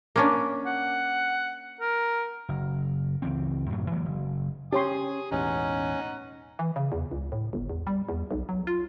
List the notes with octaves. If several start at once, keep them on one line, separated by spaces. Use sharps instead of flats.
A#3 C#4 D4
F#5
A#4
F#1
C#2 E3 C4
F#2 A2 C3 F#3
E3 F#3 G#3 A#3
F#1
C#4 D4 G4 C#5 G#5 C6 D#6
E1 A1 E2 C#4 D#4 F#5
E3
C#3
E2
C#2
A2
G1
E2
G3
E2
B1
F#3
F4